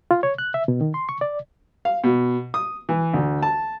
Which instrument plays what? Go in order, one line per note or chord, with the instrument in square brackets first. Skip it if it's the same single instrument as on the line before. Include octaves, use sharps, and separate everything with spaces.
[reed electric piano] F4
C#5
F#6
E5
B2
D#3
C6
C#6
D5
[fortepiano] F5
B2
D#6
E3
D2
A5